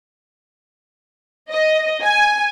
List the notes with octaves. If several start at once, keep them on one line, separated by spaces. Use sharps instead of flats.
D#5
G#5